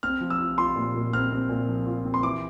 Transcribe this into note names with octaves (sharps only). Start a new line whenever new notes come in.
C4 F6
F3
E6
F4
F4 C6
A#2
A#2
C4 F6
C4
A#2
F3
F4
C4
C6
E3 D6